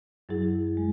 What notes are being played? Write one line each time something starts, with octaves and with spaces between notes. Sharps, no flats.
F#2 F#3 E4 G#4
G#3